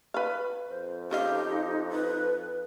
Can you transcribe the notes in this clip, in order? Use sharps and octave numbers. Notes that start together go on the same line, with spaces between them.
B4 F5
F2 C5
C#3 D#4 G4 D#5 F5
B4